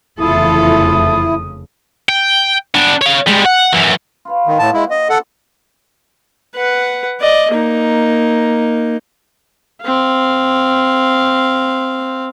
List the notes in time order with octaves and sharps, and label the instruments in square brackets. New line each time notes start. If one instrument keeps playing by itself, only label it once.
[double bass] F1 C#3 [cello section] E2 F4 A4 [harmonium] E4 [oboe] D#6
[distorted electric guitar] G5
B3 D4
C#5 F5
G3 G#3
F#5
F#2 E3
[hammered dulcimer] F4 B4 C#5
[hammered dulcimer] A#2 D#4 [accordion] D#3
[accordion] A2 A5 [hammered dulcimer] F#4
[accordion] G#3 E4
[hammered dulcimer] D4 [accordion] D#5
[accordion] A4 F#5
[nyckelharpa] B4 F#5
D5 D#5
A#3 D#4
C4 F5